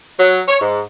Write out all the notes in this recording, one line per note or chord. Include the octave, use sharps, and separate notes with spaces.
F#3
C#5
G#2